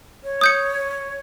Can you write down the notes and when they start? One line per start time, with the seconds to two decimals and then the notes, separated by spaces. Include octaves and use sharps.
0.24 C#5
0.41 D#6 G6 C#7